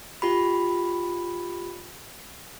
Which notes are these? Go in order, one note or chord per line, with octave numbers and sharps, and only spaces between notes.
F4 G4 B5